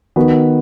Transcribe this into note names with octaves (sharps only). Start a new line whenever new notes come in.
D#3 B3 F#4 B4